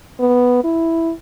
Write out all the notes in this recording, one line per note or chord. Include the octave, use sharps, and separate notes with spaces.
B3
E4